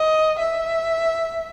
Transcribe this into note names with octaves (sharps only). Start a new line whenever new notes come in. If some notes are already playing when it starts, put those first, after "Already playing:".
Already playing: D#5
E5